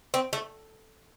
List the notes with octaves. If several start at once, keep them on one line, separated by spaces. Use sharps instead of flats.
C4
A3